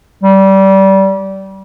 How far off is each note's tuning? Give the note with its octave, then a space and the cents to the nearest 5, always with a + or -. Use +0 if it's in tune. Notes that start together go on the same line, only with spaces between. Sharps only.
G3 -20